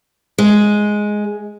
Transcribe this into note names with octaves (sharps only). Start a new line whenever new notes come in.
G#3